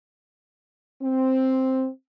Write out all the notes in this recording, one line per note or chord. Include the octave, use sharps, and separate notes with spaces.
C4